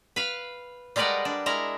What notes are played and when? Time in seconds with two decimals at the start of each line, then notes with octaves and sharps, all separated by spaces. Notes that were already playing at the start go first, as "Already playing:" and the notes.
0.16 B4 F5
0.96 G3 G#3 A#4 B4 D5 F#5
1.25 D4
1.46 G#3 E4 A#4